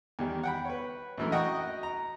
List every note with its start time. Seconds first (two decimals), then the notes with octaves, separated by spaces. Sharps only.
0.19 E2 D#3 G3
0.44 F#5 G5 B5
0.65 B4 C#5
1.18 A#1 F#2 E3 A3 A#4
1.32 F#4 D#5 F#5 G5 A#5 C#6
1.83 A#5